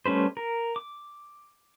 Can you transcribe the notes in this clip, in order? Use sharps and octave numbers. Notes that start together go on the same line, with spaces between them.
G3 A3 C#4 B4 C5
A#4
D6